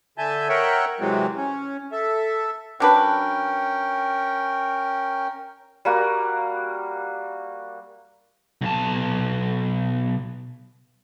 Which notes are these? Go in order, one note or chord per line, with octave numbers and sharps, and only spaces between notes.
D3 E5 G#5 A5 G6
A#4 C#5 E5 F#5 G5
C3 E3 F#3 G#3 C4
C#4
A4 E5
F#3 C#4 D4 A#4 B4 G5
G3 A#3 F#4
B1 A5